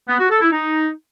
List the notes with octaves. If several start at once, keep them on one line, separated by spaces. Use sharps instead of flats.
B3
F#4
A4
E4
D#4